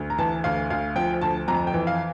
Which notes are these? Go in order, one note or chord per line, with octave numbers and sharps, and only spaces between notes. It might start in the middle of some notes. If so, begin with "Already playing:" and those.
Already playing: D2
A#5
E3 A5
D2 F5
D2 F5
F3 G5
D2 A5
F2 A#5
G5
E3
F5